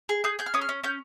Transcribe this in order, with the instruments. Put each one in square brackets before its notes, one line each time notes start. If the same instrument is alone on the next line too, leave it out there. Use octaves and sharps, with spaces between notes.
[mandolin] G#4
G#4 G6
G#4 G6
F6
C#4 D#6
F6
C#4
C#4 G6